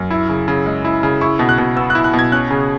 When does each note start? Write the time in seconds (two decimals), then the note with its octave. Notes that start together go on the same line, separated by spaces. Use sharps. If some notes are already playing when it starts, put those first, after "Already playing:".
Already playing: F#2
0.11 E4
0.29 C#3
0.48 C#3
0.66 G#3
0.85 E4
1.03 C#3
1.21 E4 C#6
1.39 B2
1.49 F#6
1.58 B2
1.76 B3 E6
1.90 F#6
1.95 E4
2.04 F#6
2.14 B2
2.19 G#6
2.32 C#4 F#6
2.50 C#3